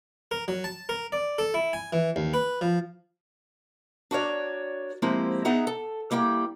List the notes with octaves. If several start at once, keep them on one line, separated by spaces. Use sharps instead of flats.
A#4
F#3
A5
A#4
D5
A4
E4
G#5
E3
D#2
B4
F3
D4 F#4 A#4 C#5 D5
F3 G#3 A#3 C4 E4 G4
B3 D#4 G#4 E5 F#5 A#5
A4
G3 A#3 E4 G5